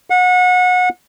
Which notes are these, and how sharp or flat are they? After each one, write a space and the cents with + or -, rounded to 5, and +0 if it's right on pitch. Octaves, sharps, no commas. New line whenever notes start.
F#5 -30